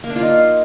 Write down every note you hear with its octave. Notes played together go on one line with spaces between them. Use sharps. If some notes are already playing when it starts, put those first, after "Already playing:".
A#3
D4
F4
D#4